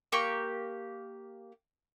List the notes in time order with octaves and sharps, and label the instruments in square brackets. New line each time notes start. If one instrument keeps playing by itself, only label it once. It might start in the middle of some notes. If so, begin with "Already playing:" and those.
[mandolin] A#3 G4 C#6